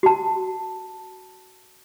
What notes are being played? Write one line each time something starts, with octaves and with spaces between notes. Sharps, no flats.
F#4 A5